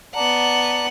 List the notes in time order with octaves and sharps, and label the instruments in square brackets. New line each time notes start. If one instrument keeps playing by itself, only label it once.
[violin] B3 F#5 [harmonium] D5 A5 A#5